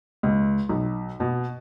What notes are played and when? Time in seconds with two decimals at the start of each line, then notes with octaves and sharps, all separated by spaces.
0.23 C#2
0.69 B1
1.20 B2